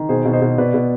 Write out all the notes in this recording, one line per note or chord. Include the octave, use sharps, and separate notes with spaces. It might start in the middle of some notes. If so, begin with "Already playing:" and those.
Already playing: D#3
B2 G#4 C5
B2
C5 D#5
B2
B2 B4 D5
B2